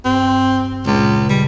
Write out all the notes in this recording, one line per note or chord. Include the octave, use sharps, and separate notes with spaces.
G2 C4
C#2 A#2 C#3
G3